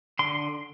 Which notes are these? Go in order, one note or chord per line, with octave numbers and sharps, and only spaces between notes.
D3 C6